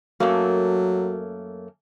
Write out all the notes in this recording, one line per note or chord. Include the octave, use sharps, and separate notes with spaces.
F#2 F#3 A3 A#3